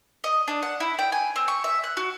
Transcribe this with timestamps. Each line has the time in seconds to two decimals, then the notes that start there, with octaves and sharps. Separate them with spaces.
0.24 D#5
0.48 D4
0.63 F#5
0.80 E4
0.99 G5
1.12 G#5
1.36 C4
1.48 C#6
1.64 E5
1.84 F#6
1.97 F#4